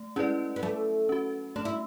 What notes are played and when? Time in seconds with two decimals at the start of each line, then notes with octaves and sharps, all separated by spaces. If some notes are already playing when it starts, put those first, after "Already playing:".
Already playing: A3
0.16 G#3 C#4 E4 B4 D5
0.56 B3
0.63 F#3 A3
1.09 C#4 F#4
1.56 A3 D4
1.65 E4